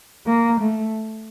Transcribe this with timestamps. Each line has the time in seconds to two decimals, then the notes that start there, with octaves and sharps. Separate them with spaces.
0.26 A#3
0.61 A3